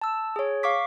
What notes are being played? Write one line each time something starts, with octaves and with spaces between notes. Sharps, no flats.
A5 E6
G#4 C#5
F5 C#6 D6 B6